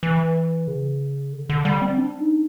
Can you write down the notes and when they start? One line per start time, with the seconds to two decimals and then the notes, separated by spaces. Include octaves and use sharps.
0.03 E3
0.67 C#3
1.33 D3
1.49 D3
1.65 G3
1.82 C4
1.98 D4
2.20 D#4